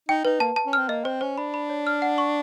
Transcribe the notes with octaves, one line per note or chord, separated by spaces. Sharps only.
D#4 G5
D#4 B4
A#3 A5
A5
C#4
C4 F6
A#3 D#5
C4 C5
C#4 C5
D4 B5
B5
C#5
F6
F#5
C#6